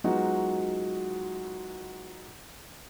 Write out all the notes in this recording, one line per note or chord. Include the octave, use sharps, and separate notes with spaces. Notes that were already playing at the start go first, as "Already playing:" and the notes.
F#3 G#3 B3 D#4 F4 F#4